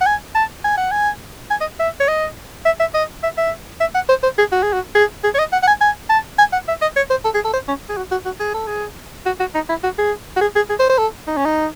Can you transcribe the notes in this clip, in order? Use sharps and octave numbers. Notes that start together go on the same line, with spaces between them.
F#5
G#5
A5
G#5
F#5
G#5
G#5
D#5
E5
C#5
D#5
E5
E5
D#5
E5
E5
E5
F#5
C5
C5
G#4
F#4
G#4
F#4
G#4
G#4
C#5
D#5
F#5
F#5
G#5
G#5
A5
G#5
F#5
E5
D#5
C#5
C5
A4
G#4
A4
C5
C#4
G#4
F#4
F#4
F#4
G#4
A4
G#4
F#4
F#4
D#4
E4
F#4
G#4
F#4
G#4
G#4
G#4
C5
C5
A4
D#4
C#4
D#4